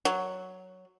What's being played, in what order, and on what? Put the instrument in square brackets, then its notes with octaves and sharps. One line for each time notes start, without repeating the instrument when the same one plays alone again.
[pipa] F#3